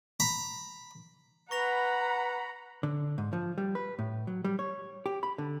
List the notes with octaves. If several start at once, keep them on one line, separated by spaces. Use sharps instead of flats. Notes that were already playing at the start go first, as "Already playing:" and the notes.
A#5 B5
B4 F#5 A#5 B5 C#6 A#6 F7
D3
G#2
F3
G3
B4
A2
F#3
G3
C#5
G4
B5
D3